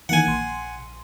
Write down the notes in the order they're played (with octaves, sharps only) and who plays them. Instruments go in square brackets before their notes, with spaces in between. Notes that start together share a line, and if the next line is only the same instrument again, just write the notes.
[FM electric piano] D#3 E3 A#3 [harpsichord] F#5 G#5
[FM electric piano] A#1 C6